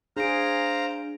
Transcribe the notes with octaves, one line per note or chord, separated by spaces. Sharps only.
D4 G#4 C5 F5 A#5 D7